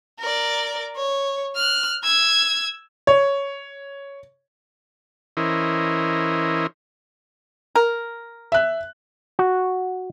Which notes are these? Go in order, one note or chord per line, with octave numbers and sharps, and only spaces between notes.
A#4 D5
C#5
F6 F#6
E6 G#6
C#5
E3 C#4 E4 A#4 C5 D#5
A#4
E5 F#6
F#4